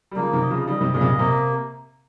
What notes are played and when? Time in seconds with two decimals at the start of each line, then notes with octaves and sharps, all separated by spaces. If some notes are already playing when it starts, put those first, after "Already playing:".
0.11 G3
0.15 C#3 F3 A#3
0.33 C3 D#3
0.42 D#5
0.50 C#3 F3
0.67 D#3 G3 D#5
0.80 C3 D#3
0.94 A#2 C#3 D#5
1.01 C3
1.06 A#2
1.19 C3 A#3